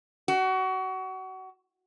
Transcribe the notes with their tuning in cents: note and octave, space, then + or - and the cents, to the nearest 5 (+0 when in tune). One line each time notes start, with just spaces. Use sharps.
F#4 +25